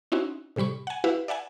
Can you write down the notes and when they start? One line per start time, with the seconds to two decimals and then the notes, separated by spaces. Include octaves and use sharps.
0.12 C4 C#4 D#4 E4 F#4
0.56 A2 C3 G3 B5 C#6
0.87 F#5 G#5
1.04 E4 F#4 G4 B4 E5 F5
1.28 D5 E5 F#5 G#5